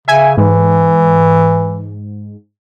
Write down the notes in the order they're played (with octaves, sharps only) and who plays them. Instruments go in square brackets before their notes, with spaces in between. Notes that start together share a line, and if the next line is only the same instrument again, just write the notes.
[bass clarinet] C#3 [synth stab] E5 G#5
[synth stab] G#2 [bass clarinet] E3